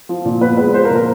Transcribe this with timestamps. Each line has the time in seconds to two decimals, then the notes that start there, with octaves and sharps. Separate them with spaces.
0.09 F3
0.25 A#2
0.41 B3 B4
0.57 G#3 B4
0.74 F3 C5
0.85 A#4
0.90 A#2
0.95 A#4